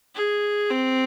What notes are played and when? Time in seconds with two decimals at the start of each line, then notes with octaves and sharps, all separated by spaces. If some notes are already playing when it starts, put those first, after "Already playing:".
0.15 G#4
0.71 C4